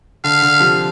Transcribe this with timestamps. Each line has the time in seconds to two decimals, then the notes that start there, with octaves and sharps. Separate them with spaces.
0.24 D3 F5
0.42 D3
0.60 C3 F3